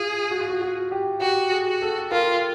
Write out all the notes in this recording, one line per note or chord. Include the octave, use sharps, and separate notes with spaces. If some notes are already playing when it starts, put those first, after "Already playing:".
Already playing: F4 G#4
F#4
F4
F#4
F#4
G4
F#4 G4
G#4
F#4
A4
F4 A#4